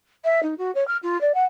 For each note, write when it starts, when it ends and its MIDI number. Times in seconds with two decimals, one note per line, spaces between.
0.25 0.40 76
0.43 0.55 63
0.58 0.72 66
0.75 0.86 73
0.88 0.97 89
1.03 1.20 65
1.21 1.32 74
1.34 1.45 78